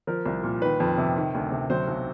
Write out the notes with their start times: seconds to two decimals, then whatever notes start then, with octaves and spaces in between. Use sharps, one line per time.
0.07 F3 A#4
0.26 C2
0.43 A#2
0.61 D#3 B4
0.80 F2
0.98 C3
1.16 D#3
1.34 D2
1.51 C3
1.70 F#3 C5
1.88 B1